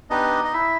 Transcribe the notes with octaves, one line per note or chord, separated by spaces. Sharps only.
B3 D4 D#4 G4 D#5
D#5
E4 E5